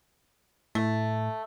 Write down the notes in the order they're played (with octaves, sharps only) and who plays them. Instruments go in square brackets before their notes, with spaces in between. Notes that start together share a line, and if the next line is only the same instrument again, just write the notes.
[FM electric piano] A2 [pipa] A3